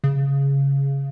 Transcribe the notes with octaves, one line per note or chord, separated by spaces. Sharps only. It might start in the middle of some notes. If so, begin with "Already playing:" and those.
C#3